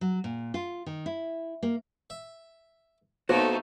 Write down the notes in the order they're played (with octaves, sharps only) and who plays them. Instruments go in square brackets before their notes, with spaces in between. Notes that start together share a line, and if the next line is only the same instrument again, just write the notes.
[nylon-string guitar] F#3
A#2
F4
D#3
E4
A#3
[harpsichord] E5
[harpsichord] B1 A#3 [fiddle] A3 D#4 [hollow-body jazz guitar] F#4 C5 C#5